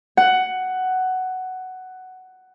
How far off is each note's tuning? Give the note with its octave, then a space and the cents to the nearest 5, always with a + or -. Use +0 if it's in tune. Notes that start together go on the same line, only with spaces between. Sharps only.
F#5 +10